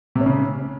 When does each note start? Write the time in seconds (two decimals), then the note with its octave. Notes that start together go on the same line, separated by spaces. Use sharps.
0.15 C3
0.21 C#4
0.26 C#3